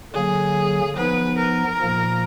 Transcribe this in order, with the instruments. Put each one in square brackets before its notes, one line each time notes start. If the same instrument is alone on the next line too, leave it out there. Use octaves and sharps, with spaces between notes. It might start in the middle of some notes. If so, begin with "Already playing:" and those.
[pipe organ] D3 F#3 A#3 [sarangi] G#4
[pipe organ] F3 B3 D#4 [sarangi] B4
[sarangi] A#4
[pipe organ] A#2 F3 A#3